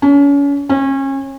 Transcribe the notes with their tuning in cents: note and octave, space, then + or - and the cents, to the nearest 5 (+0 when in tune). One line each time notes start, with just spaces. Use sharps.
C#4 +35
C#4 -30